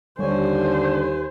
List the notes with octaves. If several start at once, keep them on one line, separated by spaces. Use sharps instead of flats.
D#2 D3 G3 C5 C#5 G#5